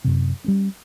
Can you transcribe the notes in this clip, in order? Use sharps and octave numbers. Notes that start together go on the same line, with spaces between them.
F#2 C3
G3 A#3 C#4